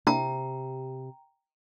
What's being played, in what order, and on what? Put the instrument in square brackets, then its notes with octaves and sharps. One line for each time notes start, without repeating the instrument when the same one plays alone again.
[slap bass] C3 [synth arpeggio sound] A#3 D4 E4 [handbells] G5 A#5